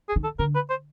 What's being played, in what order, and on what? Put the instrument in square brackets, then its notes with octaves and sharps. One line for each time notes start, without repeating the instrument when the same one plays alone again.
[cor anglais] G#4
[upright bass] D#3
[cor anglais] A4
[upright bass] D3 [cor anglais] A#4
[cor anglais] B4
C5